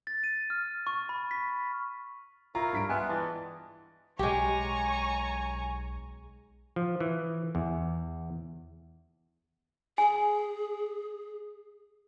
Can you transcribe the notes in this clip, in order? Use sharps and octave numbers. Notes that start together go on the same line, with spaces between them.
A6
D#7
F6
C#6
B5
B6
E4 F4 A#4 C#5 A#5
G2 B6 D7
G#3 B3 F4 E5 G5 G#5 F#6
E3 D5 D#5 A5 A6
B1 G#3 G4 C#5 G#5 A#5 C#6
F3
E3
E2
G#4 G#5